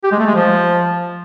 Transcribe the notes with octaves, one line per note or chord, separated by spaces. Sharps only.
G4
G#3
A3
G#3
F3